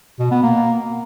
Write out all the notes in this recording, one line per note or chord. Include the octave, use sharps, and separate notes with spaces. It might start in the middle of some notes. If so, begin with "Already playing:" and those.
B2
B3
A#3